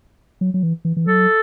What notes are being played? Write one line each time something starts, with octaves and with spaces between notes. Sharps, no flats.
F#3
F#3
E3
E3
E3
F#3 A4